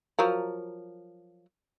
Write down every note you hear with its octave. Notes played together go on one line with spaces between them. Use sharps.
F3 F#3 A#4